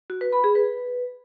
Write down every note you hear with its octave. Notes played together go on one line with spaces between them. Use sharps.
F#4
B4
B5
G#4
B4